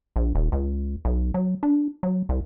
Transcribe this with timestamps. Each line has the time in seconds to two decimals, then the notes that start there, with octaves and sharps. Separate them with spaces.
0.16 A#1
0.35 D#1
0.52 C#2
1.05 B1
1.34 F#3
1.63 D4
2.03 F#3
2.29 C2